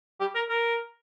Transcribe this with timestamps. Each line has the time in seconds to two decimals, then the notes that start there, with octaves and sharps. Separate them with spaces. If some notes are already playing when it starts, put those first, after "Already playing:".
0.20 G4
0.35 A#4
0.49 A#4